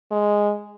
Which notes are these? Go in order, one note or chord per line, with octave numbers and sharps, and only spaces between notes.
G#3